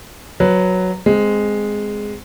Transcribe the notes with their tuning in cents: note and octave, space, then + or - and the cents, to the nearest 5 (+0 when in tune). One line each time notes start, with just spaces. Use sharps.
F#3 +0 B4 +0
G#3 +0 C4 -15